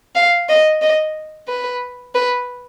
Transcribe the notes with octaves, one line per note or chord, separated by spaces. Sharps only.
F5
D#5
D#5
B4
B4